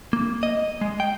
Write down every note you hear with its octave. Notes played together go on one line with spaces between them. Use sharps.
A#3
D#5
G#3
G5